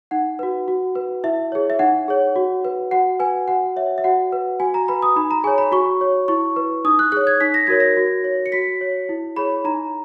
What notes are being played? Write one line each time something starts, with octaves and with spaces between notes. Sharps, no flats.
D#4 F#5
F#4 B4
F#4
B4
E4 E5
G#4 C#5
E5
D#4 F#5
G#4 C#5
F#4
B4
F#4 F#5
B4 G#5
F#4 F#5
C#5 E5
E5
F#4 F#5
B4
F#4 G#5
A#5
B4 B5
D#6
D#4 B5
A#5
G#4 C#5 G#5
B5
F#4 C#6
C#5
E4 C#6
B4
D#4 D#6
F#6
G#4 C#5 F#6
G#6
D#4 B6
A#6
F#4 A#4 C#5 G#6
A#6
F#4
C#5
C#7
F#4 B6
C#5
E4
G#4 C#5 B5
D#4 A#5